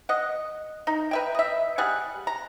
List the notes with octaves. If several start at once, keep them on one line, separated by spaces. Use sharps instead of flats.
D#5 F#5
D#4
B4 E5 G5
D#5 E5
G3 G#4 F#5
A#5